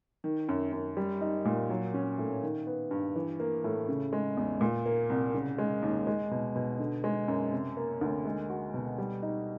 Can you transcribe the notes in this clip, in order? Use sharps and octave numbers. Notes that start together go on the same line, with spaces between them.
D#3
F#2
F#2
G3
D#4
A#2
F#3
C#4
A2
D#3
B3
G2
E3
A#3
A2
C#3
G#3
E2
A#2
A#3
C2
C#3
G#3
D#2
G#3
B2
B2
D3
G#3
F#2
C3
A#3
D2
G#3
F#4
B2
G3
D#4